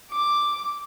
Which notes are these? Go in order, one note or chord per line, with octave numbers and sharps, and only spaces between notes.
D6